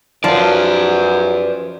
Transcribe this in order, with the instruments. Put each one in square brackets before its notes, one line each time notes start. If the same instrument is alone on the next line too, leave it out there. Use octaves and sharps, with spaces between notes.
[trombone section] F#2 [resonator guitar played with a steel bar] F3 [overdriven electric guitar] B4 D5 [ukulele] A5